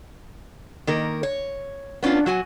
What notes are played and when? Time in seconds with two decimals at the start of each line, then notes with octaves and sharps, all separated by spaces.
0.87 D#3 A#3 A#4
1.23 C#5
2.03 B3 C#4 D4 F4
2.26 F#3 F#4 G#5